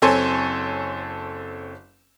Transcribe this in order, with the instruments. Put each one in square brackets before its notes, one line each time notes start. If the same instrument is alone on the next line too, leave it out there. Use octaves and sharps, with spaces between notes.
[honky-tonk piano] F#1 C4 A4 C#5 G#5 C6